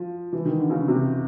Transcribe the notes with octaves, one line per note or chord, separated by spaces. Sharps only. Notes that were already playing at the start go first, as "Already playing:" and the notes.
Already playing: F3
E3
D#3
D3
C#3
C3